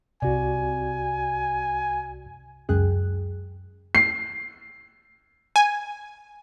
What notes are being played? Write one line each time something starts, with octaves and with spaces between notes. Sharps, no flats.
C2 C3 F#4 D5 G#5
C#2 F#2 G#4 G5 F#6
C7
G#5